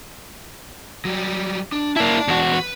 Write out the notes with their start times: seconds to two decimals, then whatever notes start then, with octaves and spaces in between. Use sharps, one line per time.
1.05 F#3 G3
1.72 D4
1.96 A#3 E4 D5 A5
2.28 E2 F#4
2.53 B4